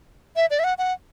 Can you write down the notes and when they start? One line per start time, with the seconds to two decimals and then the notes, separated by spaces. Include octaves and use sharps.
0.36 E5
0.50 D5
0.59 E5
0.64 F#5
0.78 F#5